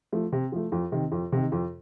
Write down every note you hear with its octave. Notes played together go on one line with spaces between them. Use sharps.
F3 A3
C3
F3 A3
F2
C3 D#3
F2
C3 D#3
F2